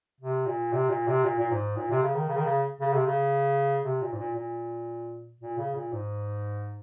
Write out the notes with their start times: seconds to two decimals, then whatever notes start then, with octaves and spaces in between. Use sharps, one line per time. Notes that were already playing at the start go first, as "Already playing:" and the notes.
0.21 C3
0.46 A#2
0.73 C3
0.89 A#2
1.07 C3
1.24 A#2
1.39 A#2
1.51 G#2
1.76 A#2
1.90 C3
2.02 C#3
2.16 D#3
2.29 C#3
2.37 D#3
2.45 C#3
2.81 C#3
2.93 C3
3.06 C#3
3.85 C3
4.02 A#2
4.12 G#2
4.19 A#2
4.36 A#2
5.41 A#2
5.58 C#3
5.76 A#2
5.92 G#2